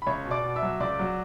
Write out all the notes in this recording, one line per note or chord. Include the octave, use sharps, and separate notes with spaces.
B5
C#2 C#5 C#6
B2
D5 D6
B2
E5 E6
F#3
C#2 D5 D6
F#3